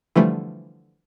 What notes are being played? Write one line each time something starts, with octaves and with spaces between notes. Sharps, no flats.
D3 E3 F3 G3 A3